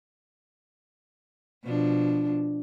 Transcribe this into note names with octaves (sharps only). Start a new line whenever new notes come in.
B2 F3 D4